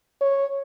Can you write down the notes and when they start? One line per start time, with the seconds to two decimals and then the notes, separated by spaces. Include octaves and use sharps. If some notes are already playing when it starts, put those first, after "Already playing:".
0.21 C#5